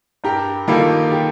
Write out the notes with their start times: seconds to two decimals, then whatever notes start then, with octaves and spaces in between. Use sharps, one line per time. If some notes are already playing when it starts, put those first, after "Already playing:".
0.24 G2 G4 A#4
0.68 D#3 G3 A#3 F4 A4
1.12 G4